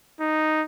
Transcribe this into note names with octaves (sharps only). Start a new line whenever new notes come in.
D#4